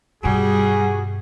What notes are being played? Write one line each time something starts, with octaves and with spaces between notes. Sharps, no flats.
G2 B2 G3 F#4 G#4